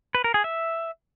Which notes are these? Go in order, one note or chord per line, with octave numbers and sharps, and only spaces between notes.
B4
A#4
G#4
E5